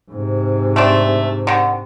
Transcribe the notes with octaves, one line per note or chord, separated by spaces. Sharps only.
G#2 C3
A3 C4 D4
D3 D#3